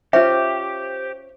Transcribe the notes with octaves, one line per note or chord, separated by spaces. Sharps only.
C#4 F4 G4 C5 E5